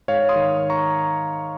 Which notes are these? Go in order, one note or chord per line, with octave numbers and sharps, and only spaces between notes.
G#2 C#5 F5
C6 D#6
D#3
A#5 C#6